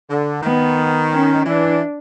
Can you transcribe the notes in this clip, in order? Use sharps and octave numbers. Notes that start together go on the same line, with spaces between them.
D3
D#3 B3
C#4
E3 D4